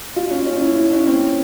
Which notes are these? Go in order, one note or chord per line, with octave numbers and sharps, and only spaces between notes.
F4
C#4
C#4
E4
E4
C#4
C4